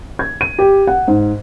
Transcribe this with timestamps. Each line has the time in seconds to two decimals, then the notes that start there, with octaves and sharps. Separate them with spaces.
0.19 G#6
0.41 D#7
0.59 G4
0.87 F#5
1.08 G#2